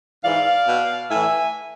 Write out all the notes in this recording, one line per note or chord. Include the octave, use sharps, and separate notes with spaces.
G#2 E3 D5 F5
B2
A2 E3 E5 G#5